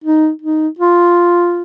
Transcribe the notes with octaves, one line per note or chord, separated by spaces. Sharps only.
D#4
D#4
F4